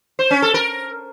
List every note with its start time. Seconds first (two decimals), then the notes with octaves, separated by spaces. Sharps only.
0.19 C5
0.31 C#4
0.42 A4
0.54 A#4